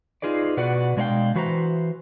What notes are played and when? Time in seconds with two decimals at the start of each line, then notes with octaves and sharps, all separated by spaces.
0.22 D#4 F4 G#4 B4 D5
0.57 B2 F#4 B4 D5 F#5
0.97 B2 G#3 D4 C#5 F5 G5
1.35 E3 F#4 B4 C5 A#5